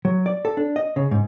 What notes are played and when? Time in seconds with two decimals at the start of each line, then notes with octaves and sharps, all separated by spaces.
0.05 F#3
0.26 D5
0.45 A4
0.57 D4
0.76 D#5
0.96 C#3
1.11 G#2